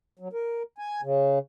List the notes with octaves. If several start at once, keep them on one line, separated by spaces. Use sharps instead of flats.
F#3
A#4
G#5
C#3